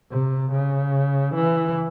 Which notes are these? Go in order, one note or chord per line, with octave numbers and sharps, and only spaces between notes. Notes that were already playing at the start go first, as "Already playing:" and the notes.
C3
C#3
E3